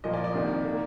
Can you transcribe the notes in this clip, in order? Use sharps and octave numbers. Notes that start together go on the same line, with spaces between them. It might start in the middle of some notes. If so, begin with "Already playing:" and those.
A#2 F3 A#3 D#5
D5
D5
C2 C3 D#3 A#3
D#3 A#3